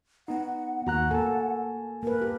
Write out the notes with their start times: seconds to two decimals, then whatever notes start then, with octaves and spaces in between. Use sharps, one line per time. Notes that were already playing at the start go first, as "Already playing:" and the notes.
0.28 B3 D#4 F#5
0.87 D#2 F#4 F#5 A#5 F#6
1.11 A#3 A4 G#5 A5
2.03 A#3 A#4 B4
2.22 G4